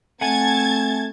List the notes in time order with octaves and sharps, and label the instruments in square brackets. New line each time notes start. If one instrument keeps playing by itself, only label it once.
[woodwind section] A3 C4 [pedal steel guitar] F#5 G#5 [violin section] A5 G#6 A6